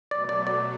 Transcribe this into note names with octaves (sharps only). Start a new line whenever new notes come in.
B2 F#3 A3 D5
D5
D5